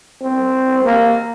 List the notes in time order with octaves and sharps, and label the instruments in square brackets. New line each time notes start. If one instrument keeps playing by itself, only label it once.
[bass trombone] C4
A#3